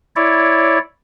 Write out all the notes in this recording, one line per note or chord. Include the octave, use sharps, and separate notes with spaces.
E4 C#5 D5